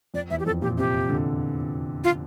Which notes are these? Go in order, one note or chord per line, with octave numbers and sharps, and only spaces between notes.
F2 D5
E2 E5
G4
F2 A4
A#2 G4
C3 G4
D3
F4